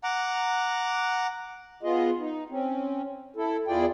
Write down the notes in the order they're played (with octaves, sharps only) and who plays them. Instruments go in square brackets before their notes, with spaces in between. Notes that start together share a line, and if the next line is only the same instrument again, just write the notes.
[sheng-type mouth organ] F#5 A#5 D6
[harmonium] B3 F4 G#4 D#5
D#4
C4 C#4
E4 A4
E2 E4 F4 G#4 D5 G5